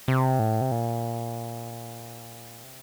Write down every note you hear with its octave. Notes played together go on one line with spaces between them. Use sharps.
C3
A2
C3
A#2
C3